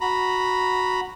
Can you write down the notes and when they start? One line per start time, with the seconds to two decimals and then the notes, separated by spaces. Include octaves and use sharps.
0.01 F#4 A#5 B5